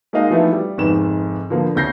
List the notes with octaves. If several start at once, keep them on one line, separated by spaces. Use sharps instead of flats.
G#3 A#3 D#4 D#5 F5
E3 F3 A3 B3 D#4 E4
G3
F1 G#2 D#3 B3 E7
D3 F3 A#3 B3
D2 C#3 G6 A#6 C7